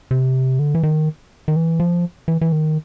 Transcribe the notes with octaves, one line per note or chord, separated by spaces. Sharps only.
C3
D3
E3
D#3
D#3
E3
F3
E3
E3
D#3